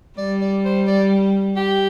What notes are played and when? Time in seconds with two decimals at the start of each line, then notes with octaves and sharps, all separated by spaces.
0.18 G3 D5
0.41 D5
0.65 C5
0.87 D5
1.57 G4